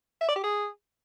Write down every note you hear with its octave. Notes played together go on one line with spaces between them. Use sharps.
E5
D5
G4
G#4